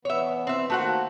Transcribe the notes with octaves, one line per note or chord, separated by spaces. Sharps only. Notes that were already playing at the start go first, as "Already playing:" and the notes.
E3 B3 C#5 E5
C4 E5
D#3 A3 A#3 F#4 C5 F#5